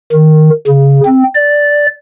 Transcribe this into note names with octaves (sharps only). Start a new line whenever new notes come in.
D#3
C#3
C4
D5